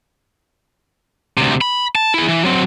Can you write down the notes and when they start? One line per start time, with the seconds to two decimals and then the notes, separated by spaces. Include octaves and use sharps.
1.38 D2 C3
1.61 B5
1.95 A5
2.14 E4 G#4
2.28 E3
2.44 F#3 C4